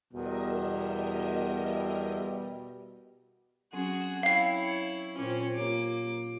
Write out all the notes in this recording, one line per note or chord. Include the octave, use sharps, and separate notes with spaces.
E2 B2 G3 A#4 D#5 E5
F#3 C4 C#4 F#4 G#4
E4 C#5 F5 G5 C7
A#2 C4 C#4 F4
A#3 F4 G4 C#5 D6